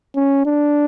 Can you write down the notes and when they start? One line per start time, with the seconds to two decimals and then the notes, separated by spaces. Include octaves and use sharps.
0.15 C#4
0.46 D4